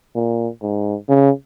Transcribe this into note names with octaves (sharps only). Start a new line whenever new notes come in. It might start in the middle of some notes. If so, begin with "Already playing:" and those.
A#2
G#2
C#3